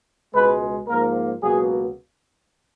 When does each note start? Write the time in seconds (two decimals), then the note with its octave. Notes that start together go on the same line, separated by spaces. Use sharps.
0.32 C#2 B2 G#3 B4
0.87 G#2 F3 A#3 A#4
1.41 C#2 B2 F#3 A#3 G#4